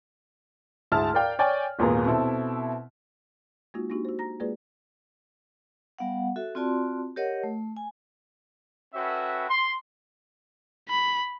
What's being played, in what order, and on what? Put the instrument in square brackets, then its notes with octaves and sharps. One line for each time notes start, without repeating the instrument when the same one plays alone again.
[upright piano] D2 G#2 E4 G#4 A5 F6
A#4 D5 F5 G5
C#5 D5 G5 G#5
G#1 D#2 A#2 B3 G#4 A#4
B2 C4 E4 A4
[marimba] G#3 A#3 D#4 F4 F#4
A#3 D4 D#4 F#4 G4
F#4 C5
A#5 A#6
G#3 A#3 F4 G#4 B4 D5
[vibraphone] G3 B3 F5 F#5
F#4 A4 E5
C4 F4 F#4 D5 A5 C6
G4 A#4 C#5 D#5 F#5
A3
G#5
[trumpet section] C#4 F#4 A4 B4 E5 G5
C6
[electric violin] B5